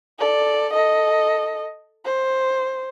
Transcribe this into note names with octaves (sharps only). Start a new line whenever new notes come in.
A4 D5
A4 D#5
C5